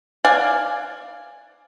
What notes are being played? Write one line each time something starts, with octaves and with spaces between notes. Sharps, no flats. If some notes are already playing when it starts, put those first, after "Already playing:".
D5 F5 F#5 G#5